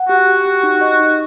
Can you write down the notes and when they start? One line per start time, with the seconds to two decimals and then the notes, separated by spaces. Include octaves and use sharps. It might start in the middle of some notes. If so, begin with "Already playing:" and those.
Already playing: F#5
0.09 F#4 G4
0.27 G4
0.46 G4
0.63 D#4
0.81 D#5
1.00 D#4